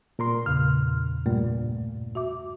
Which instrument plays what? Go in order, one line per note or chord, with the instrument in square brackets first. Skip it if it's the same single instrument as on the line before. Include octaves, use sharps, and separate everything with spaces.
[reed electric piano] A#2 A#4 C6
[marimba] E2 A#2 C#3 [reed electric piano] F6
[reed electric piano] G2 A#2 [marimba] A3
[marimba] F#4 E5 D6